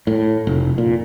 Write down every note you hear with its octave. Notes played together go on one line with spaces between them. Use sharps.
A2
F1
A#2